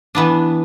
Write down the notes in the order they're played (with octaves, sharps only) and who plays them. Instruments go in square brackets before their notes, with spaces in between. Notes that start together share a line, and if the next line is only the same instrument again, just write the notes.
[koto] E3 B3 D4